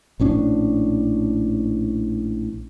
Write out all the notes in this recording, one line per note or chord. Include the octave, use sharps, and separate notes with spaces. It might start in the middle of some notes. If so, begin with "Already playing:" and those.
A#1 A2 C#4 D4